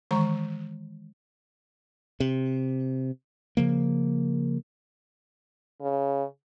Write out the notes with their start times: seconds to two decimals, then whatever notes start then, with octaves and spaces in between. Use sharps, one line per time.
0.11 D#3 E3 G#3 A#5 C#6
2.20 C3
3.57 C#3 F3 A#3
5.81 C#3